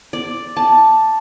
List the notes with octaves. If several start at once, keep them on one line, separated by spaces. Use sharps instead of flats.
D5
A5